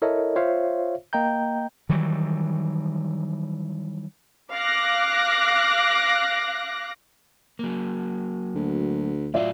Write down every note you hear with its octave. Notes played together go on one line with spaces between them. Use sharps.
E4 A4 A#4 C#5 D#5 E5
F4 C5 C#5 E5 F5
A#3 D#5 G5 A#5 G6
D#3 E3 F#3 G3
F5 D6 F#6 A#6
F#3 A#3
D2
A2 F#3 F4 D5 E5 F5